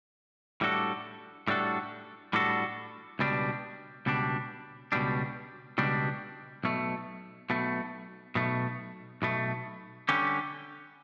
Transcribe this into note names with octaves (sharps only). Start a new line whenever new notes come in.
A2 G3 D4 F#4 A4
A2 G3 D4 F#4 A4
A2 G3 D4 F#4 A4
C#2 B2 G3 D4
C#2 B2 G3 D4
C#2 B2 G3 D4
C#2 B2 G3 D4
B1 B2 A3
B1 B2 A3
B1 B2 A3
B1 B2 A3
D3 G3 C#4 G4